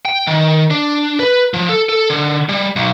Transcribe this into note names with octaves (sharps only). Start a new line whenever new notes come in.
G5
D#3
D4
B4
F3
A4
A4
D3
G3
B1